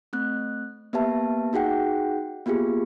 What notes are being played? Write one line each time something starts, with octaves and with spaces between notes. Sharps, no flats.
A3 C4 F#6
A#3 B3 G4 B4 E5 A5
D#4 F#4 G#4 F#5 G5
A#3 B3 F4 G4 G#4